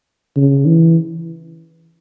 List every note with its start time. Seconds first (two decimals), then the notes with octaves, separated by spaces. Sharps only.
0.37 C#3
0.66 E3